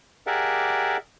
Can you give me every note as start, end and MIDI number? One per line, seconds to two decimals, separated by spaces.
0.27 0.97 67
0.27 0.97 68
0.27 0.97 70
0.27 0.97 74
0.27 0.97 76
0.27 0.97 78